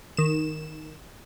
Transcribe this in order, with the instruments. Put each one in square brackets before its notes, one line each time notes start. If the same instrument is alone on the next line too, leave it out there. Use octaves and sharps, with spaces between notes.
[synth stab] D#3 E7